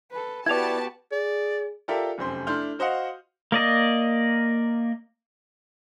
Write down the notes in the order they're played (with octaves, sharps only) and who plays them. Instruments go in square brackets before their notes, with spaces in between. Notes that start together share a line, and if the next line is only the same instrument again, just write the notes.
[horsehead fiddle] A4 B4
[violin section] B3 A5 [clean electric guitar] E4 D5 [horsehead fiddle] F#4 G4 [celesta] G#6 F7
[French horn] G#4 [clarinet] D5
[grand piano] F4 G4 A4 A#4 D5 E5
F1 F#2 C4 C6
A3 D4 E4 C6 F6 G6
F#4 C5 D#5 F5 F#5
[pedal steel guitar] A#3 D5 D#5